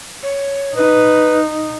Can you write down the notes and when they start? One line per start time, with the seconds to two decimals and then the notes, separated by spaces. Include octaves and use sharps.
0.23 C#5
0.76 D#4 B4